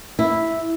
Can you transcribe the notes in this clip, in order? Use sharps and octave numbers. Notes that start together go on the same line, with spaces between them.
E4